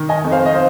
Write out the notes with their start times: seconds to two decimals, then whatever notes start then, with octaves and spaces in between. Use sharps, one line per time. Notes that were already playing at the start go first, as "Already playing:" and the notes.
Already playing: D#3
0.09 D#5 G#5
0.24 F2
0.31 C5 F5
0.46 D#5
0.54 C5 F5